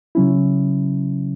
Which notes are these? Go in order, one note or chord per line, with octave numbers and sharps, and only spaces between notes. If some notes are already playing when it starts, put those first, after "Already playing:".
C#3 F#3 C#4 E4